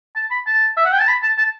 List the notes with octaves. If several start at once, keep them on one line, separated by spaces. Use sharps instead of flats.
A5
B5
A5
E5
F#5
G5
A5
B5
A5
A5